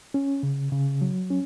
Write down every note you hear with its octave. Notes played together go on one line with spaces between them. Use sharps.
C#4
C#3
C#3
F#3
C#4